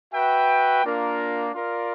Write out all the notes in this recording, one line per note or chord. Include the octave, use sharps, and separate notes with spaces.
F#4 B4 E5 G5
A#3 D4 F4 A#4
F4 A#4 D5